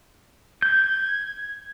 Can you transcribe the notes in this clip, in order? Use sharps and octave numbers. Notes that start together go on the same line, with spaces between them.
G6 G#6